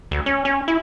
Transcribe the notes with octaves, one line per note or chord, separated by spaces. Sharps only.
D2
C#4
C#4
E4